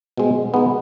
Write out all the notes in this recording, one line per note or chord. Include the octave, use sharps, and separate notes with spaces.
B2 G#3 C4
B2 G#3 B3 D#4